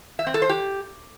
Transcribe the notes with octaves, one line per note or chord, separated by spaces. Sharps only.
E5
C4
A4
C5
G4